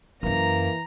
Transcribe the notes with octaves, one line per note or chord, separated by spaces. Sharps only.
F#2 E3 A#3 E4 A#5